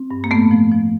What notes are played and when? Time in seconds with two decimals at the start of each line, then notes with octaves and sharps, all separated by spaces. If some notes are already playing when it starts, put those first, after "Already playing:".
Already playing: C4
0.11 G2
0.24 A#3
0.30 A2 A3 B3
0.51 F3
0.71 F3